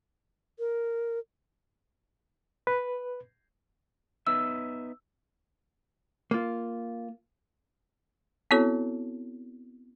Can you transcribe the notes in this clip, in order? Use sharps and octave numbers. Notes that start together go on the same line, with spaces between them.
A#4
B4
B3 D#4 E5 E6
A#3 F4
B3 C4 E4 F#4 A4 C#5